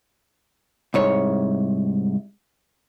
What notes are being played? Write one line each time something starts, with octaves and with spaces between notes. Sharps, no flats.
C2 G#2 C#5